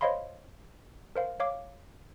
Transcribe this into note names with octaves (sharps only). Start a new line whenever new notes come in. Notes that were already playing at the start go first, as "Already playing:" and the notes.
C5 C#5 D#5 F5 B5 C6
A#4 C5 F5
C#5 F5 D6